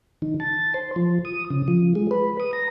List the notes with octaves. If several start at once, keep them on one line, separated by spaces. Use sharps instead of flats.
D#3
A5
C5
F3
D#6
C#3
F3
G#3
B4
D#6
A#5